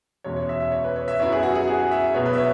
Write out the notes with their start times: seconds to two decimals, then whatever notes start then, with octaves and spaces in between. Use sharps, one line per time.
0.24 E2 B2 G#3 C#4 C#5
0.36 C#5
0.49 E5
0.60 E5
0.72 C#5
0.84 B4
0.96 C#5
1.08 E5
1.19 F#2 F#3 B3 E4 C#5
1.32 G#4
1.43 F#4
1.55 G#4
1.68 G#4
1.91 E5
2.14 B2 F#3 B3 C#5
2.26 B4
2.33 E5
2.38 C#5